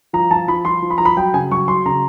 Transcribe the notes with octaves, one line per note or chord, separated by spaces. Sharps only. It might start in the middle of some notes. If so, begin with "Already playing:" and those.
F3 A#5
F3 A5
F3 B5
F3 C6
F3
B5
F3 A#5
B5
F#3 G5
C#3 G#5
F#3 C#6
F#3 C6
C#3 A#5